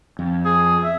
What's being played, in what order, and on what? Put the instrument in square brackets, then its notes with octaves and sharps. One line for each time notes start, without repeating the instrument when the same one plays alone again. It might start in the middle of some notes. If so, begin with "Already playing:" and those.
[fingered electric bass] F2
[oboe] G#4
E5